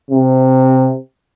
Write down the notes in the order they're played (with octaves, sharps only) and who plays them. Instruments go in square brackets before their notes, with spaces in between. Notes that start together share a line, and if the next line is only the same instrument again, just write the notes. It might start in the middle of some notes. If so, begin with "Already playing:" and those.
[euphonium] C3